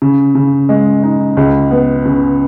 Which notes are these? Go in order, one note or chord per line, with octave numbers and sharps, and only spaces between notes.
C#3
C#3
G#3
D#4
C#2
B3
C#3